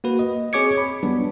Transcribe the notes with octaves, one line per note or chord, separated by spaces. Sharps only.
A#3 F#4 B4
D#5
C4 G#4 C#5 D6 G#6 C#7
B5
F#3 G3 B3 D4